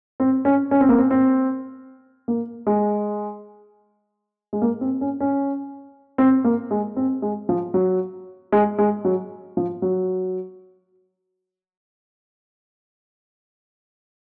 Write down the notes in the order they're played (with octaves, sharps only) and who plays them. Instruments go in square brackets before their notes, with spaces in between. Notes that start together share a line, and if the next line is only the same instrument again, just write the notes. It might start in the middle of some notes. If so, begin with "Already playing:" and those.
[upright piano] C4
C#4
C#4
C4
A#3
C4
C4
A#3
G#3
G#3
A#3
C4
C#4
C#4
C4
A#3
G#3
C4
G#3
F3
F#3
G#3
G#3
F#3
F3
F#3